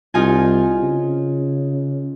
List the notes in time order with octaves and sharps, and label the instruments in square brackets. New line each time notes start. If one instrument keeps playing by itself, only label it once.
[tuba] C2 [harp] D#4 F4 G#5
[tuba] C#3